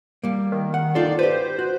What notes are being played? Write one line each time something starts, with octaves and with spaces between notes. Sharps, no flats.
G3 A#3
D#3
F#5
D#4 F4 A4 D5
G4 B4 C5
F#4